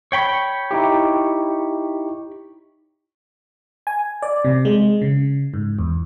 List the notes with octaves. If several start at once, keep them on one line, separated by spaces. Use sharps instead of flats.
C#5 G5 B5
D#4 E4 G4
G#5
D5
C3
G#3
C#3
G#2
E2